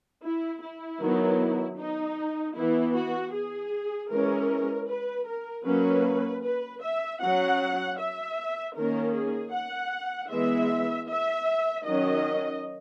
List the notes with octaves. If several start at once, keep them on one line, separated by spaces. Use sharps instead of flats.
E4
E4
D#3 F#3 B3
D#4
E3 B3 E4
F#4
G#4
E3 G#3 C#4 A#4
B4
A#4
F#3 A#3 C#4 B4
B4
E5
F#3 C#4 F#5
E5
D#3 A#3 C#4 A#4
G#4
F#5
E3 G#3 B3 E5
E5
D#3 F#3 C#4 D#5